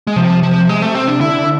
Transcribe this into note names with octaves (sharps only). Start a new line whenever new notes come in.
G#3
C3 F3
F3
G#3
A3
C4
D4
D3 E4